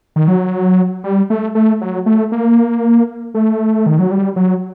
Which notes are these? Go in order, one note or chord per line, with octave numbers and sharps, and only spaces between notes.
D#3
F#3
G3
A3
A3
F#3
A3
A#3
A3
D#3
F#3
G3
F#3